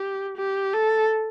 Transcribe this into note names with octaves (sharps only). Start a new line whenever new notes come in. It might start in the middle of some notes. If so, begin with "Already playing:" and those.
Already playing: G4
G4
A4